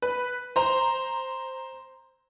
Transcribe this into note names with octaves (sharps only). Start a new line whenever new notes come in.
B4
C5 A#5 C6